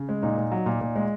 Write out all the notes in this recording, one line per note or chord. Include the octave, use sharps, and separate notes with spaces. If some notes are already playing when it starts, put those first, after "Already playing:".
Already playing: C#3
G#3
A#2 D#4
A#2
F#3
A#2
A#2
G#3